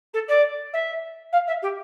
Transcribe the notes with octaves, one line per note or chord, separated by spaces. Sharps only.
A4
D5
E5
F5
E5
G4